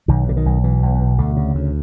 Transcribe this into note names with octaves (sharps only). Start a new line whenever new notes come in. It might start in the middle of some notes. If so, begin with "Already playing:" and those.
B1 D#3
B2 D3
D#3
B1
B2 E3
B1
B2
D2 D3
C#3
D2